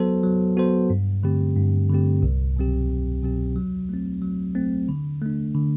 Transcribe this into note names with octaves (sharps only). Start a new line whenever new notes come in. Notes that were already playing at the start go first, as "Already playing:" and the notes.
Already playing: F#3 B3 F#4 A4 C5
F#3
B3 F#4 A4 C5
G2
D3 A3 C4 G4
G2
D3 A3 C4 G4
C2
B2 F#3 C4 G4
C2
B2 F#3 C4 G4
F#3
A3 C4
F#3
A3 C4
D3
A3 D4
D3